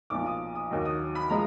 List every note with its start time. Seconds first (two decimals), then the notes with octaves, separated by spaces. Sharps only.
0.10 B1 A#2 F3 D6
0.26 D#6
0.55 D#6
0.71 D#2 D#3 F#3
0.85 D#6
1.15 B5
1.30 F3 G#3 A#5